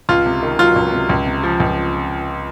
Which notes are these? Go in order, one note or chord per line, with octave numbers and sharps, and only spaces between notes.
C#2 F4
C3
D#3
F#3 F4
C#2
C3
C#2
C3
F3
C#2